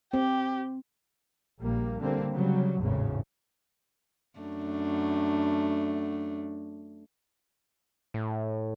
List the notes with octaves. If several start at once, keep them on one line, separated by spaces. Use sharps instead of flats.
C4 G4
A#1 G3 A#3
D3 G3 A#3 C4
C#3 F#3 G3
G#1 E2 A2 C#3
F#2 A3 D4
A2